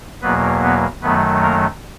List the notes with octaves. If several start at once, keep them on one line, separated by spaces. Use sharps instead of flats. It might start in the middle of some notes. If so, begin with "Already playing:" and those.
E2 B2 F#3 A#3 B3 B4
B3 B4
F#2 D#3 F#3 A3 B3 B4
A#3 A#4